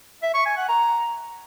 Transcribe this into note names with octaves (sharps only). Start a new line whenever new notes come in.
E5
C#6
G#5
F#5
A#5